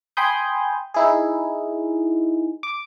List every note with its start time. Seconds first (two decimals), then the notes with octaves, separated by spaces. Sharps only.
0.17 G5 G#5 B5 C6 D#6 G6
0.94 D#4 E4 G#4
2.63 D6